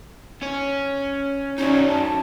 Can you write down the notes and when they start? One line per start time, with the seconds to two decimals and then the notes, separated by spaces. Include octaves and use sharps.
0.42 C#4 C#5
1.58 C#4 D#4 F#4 D5
1.89 A5